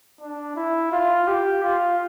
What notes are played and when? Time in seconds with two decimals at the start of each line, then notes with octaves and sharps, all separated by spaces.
0.20 D4
0.56 E4
0.92 F4
1.27 G4
1.64 F4